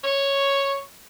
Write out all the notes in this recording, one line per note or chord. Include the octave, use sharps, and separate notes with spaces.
C#5